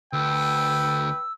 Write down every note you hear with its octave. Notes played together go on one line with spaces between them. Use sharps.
D2 B4 G5 E6